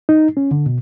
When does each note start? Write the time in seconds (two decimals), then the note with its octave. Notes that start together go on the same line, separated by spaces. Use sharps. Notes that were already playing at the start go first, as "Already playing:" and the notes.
0.09 D#4
0.37 C#4
0.51 D3
0.66 B2